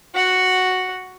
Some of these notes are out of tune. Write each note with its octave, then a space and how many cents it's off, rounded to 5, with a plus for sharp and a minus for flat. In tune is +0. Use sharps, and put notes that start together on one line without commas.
F#4 +0 F#5 +0